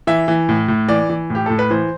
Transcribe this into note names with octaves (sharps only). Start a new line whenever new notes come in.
E3 E5
E3
A2
A2
E3 D5
E3
A2 G4
A2 A4
B4
E3 C5